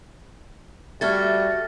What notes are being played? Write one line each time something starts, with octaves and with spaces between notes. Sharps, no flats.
G3 A3 F#4 F6 G#6 A6